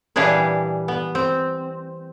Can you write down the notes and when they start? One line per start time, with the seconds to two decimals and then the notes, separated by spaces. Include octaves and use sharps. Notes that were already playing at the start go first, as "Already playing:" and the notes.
0.16 A#2 E3 G3 D4 G#4 B4
0.88 B3
1.15 C4